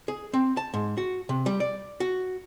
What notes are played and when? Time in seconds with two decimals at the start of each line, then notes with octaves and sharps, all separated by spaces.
0.08 G#4
0.34 C4
0.57 A5
0.74 G#2
0.98 F#4
1.29 C3
1.46 G3
1.60 D5
2.00 F#4